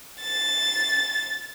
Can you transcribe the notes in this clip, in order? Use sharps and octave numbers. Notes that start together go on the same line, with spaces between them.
A6